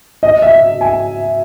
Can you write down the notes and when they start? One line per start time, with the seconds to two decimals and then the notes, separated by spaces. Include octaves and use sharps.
0.23 D#5
0.42 E5
0.81 G#5